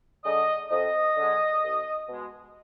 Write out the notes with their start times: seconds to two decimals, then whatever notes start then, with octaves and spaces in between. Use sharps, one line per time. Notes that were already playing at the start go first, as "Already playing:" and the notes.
0.25 D3 G#3 D#5
0.70 F2 D#5
1.17 D3 G#3
1.63 C2
2.09 B2 G#3